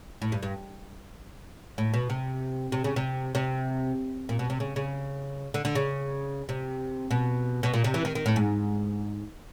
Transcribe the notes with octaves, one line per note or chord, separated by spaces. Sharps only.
A2
G2
G2
A2
B2
C3
C3
C#3
C3
C3
A#2
B2
C3
C#3
C#3
D3
D3
C#3
C3
B2
B2
A#2
C3
E3
D#3
D#3
A2
G#2